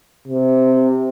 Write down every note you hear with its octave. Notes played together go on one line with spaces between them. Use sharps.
C3